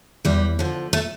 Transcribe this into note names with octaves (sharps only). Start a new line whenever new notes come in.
E2 G3
D3 F3
A3